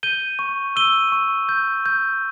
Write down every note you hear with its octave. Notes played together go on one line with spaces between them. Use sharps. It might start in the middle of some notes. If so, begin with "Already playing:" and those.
G6 D#7 G7
C#6
E6 D#7 G7
C#6
G6
G6